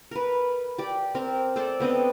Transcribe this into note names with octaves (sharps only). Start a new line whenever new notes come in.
A#4 B4
G4 D5
C4 A#4
A4 C5 D5 A5
B3 C4 D4 D#5